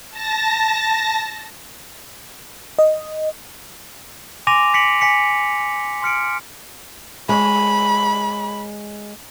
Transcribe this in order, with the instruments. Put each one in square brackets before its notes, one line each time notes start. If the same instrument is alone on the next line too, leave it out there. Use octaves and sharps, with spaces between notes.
[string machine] A5 A#6
[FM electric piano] D#5
[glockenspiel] G#5 C6 D6 A#6 D#7 F7
B6 C#7 D7 F#7
G#5 B6 C#7
C6 F6 C#7 D7
[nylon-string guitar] G#3 C#5 [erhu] B5